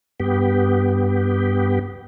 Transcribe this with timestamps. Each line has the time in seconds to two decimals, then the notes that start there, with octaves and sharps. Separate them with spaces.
0.20 G2 B3 G4